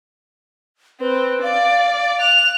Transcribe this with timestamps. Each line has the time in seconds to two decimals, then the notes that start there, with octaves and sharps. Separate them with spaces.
1.00 C4 B4
1.42 D5 F5
2.20 F#6 F7